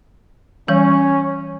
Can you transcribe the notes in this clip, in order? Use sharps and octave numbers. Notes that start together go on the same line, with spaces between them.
E3 G3 C#4